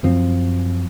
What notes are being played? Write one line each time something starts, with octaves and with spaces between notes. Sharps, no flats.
F#2 F3 C4